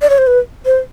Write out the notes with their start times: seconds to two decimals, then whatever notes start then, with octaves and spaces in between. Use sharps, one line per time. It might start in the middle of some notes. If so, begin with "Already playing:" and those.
0.02 D5
0.10 C#5
0.18 C5
0.27 B4
0.65 C5